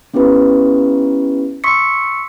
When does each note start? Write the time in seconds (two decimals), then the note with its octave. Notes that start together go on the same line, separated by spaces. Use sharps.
0.14 B3 C#4 E4 G4 B4
1.64 C6 C#6 D#6 E6 B6 C#7